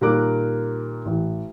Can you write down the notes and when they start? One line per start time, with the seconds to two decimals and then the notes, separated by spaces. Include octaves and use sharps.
0.01 A#2 D#3 G3 A#4 D6 F#6
1.05 A1